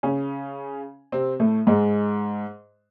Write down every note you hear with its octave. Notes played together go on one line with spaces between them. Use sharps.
C#3 C#4
C3 C4
A2 A3
G#2 G#3